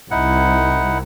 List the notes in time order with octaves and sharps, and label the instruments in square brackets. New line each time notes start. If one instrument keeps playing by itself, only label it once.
[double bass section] C2 [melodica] D#4 E4 F#5